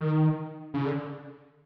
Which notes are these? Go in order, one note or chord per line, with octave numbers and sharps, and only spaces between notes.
D#3
C#3
D3